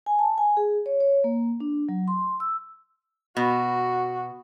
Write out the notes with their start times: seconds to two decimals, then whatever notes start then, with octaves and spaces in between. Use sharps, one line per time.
0.06 G#5
0.19 A5
0.38 G#5
0.57 G#4
0.86 C#5
1.00 C#5
1.24 A#3
1.60 D4
1.89 F#3
2.08 C6
2.40 E6
3.37 B2 F#4